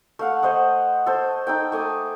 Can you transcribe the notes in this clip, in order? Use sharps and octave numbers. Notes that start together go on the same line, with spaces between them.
A3 F5 F#5
A3 C5 D#5 F#5
A4 C5
D#4 A4 G5
A3 G#5 D6 D#6